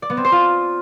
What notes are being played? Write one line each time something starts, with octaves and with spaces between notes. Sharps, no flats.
D5
B3
C4
C5
F4